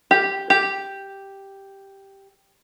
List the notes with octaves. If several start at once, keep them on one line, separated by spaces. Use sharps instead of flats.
G4
G4